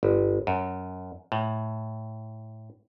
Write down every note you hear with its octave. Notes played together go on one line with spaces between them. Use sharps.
G1
F#2
A2